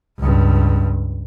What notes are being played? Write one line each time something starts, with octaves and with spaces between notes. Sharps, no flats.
C#2 G2